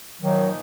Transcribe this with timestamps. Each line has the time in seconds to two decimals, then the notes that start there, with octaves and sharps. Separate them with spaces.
0.21 A#2 D#3 F3 F#3 A#3 D#4